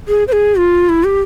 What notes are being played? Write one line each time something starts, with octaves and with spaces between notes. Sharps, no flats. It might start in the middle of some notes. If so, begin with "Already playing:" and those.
G#4
C5
G#4
F4
E4
G4